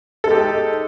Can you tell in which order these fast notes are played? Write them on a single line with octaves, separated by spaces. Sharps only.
A4 G#3 G4 D#4